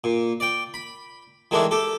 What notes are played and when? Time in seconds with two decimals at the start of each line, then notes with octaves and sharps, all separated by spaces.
0.04 A#2
0.40 D5 G5
0.74 B5
1.51 D#3 E3 G#3 A3 D4 E4
1.71 G4 A4